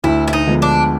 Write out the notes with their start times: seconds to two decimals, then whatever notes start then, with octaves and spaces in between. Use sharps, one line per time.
0.04 D2 E4
0.28 E4
0.33 D#4
0.47 D3 F3 G#3 B3
0.62 D4